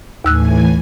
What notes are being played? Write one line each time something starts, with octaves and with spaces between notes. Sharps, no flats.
D#2 A2 E3 G#5 E6 F#6